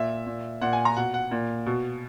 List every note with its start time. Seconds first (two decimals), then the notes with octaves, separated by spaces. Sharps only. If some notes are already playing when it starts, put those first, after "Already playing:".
Already playing: A#2 E5
0.26 A#2
0.62 A#2 F#5
0.73 G#5
0.85 A#5
0.96 B2 F#5
1.14 F#5
1.31 A#2
1.66 B2